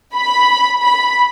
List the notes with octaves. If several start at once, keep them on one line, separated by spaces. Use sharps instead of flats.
B5
B5